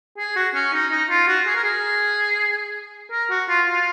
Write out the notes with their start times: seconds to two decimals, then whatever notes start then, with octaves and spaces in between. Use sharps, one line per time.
0.18 G#4
0.36 F#4
0.55 C#4
0.73 D#4
0.91 D#4
1.10 F4
1.27 F#4
1.47 G#4
1.56 A#4
1.64 G#4
3.12 A#4
3.30 F#4
3.49 F4
3.67 F4